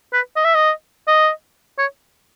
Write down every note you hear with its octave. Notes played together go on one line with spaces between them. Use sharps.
B4
D#5
E5
D#5
D#5
C#5